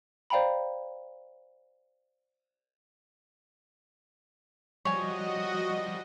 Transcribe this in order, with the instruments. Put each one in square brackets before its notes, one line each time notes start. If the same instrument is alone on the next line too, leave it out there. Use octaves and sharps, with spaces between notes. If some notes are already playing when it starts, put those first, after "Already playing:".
[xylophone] C5 D5 F5 G5 A#5 B5
[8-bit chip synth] F3 G3 [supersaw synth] F#4 D#5 [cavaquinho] C#5 G#5